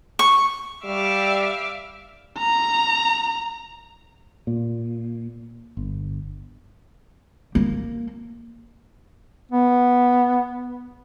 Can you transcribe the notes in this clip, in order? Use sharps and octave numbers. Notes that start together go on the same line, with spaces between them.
C#6
G3 E5 F5 D6
A#5
A#2
G1
A#3
B3